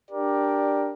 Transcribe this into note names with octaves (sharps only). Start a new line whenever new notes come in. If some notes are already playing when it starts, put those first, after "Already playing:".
D4 G4 A#4 D5